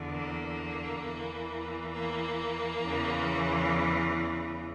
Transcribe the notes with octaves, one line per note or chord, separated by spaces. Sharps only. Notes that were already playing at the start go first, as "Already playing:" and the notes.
Already playing: E2 D3
A#3
E2 E3
A#3
E2 C#3 E3